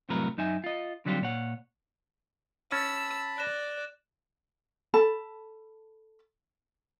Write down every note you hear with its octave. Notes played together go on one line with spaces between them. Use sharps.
C2 F2 A2 F#3 A#4 B4
F#2 D#4 E5 G#5
F4 D#5
D3 F#3 G3 C4 F4
A#2 C#5 F#5
C#4 A5 B5 E6 A6
D5 F#6 A#6 E7
A4 A5 B5